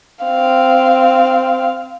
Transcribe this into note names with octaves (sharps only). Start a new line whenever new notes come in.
C4 F5